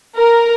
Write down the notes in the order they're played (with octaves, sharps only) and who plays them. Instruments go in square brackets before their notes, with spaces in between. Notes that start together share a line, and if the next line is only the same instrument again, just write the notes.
[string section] A#4